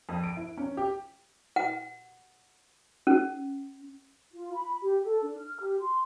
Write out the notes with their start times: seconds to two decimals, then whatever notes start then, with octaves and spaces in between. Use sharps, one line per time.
0.09 F2
0.24 D7
0.37 E4
0.58 C#4
0.77 G4
1.56 F#5
3.07 C#4
4.33 F4
4.54 B5
4.82 G4
5.05 A4
5.22 D4
5.39 F6
5.60 G4
5.79 C6